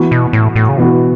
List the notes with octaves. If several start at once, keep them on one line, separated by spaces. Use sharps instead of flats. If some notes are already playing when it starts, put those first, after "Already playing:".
Already playing: E3 B3 F#4
B2
A2
A2
C#3
B2 E3 B3 F#4